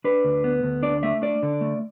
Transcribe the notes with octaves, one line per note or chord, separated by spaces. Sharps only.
D4 B4
D2
B3
D2
D4 D5
A3 E5
D4 D5
D3
A3